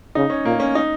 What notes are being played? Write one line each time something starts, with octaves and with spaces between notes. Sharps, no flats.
C#3 D#4
C#4
A#2 A#3
C#4
D#4